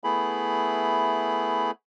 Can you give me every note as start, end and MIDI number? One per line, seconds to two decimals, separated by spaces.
0.04 1.71 57
0.04 1.71 59
0.04 1.71 64
0.04 1.71 68
0.04 1.71 83